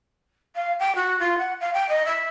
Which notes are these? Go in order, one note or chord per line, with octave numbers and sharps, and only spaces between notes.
F5
G5
F#4
F4
F#5
F5
G5
D#5
E5